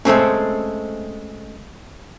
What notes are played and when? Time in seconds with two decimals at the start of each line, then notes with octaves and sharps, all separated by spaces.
0.05 G#3 A3 C4 C#4